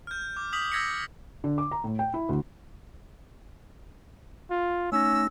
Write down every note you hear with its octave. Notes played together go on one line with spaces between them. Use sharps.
F6 G6
D6
D#6 G6 B6 F7 F#7
E6 G6 G#6 A#6 B6 C#7
D3
D6
A#5
A2
G5
E4
D2
F4
A3 C#4 D#4 E6 A#6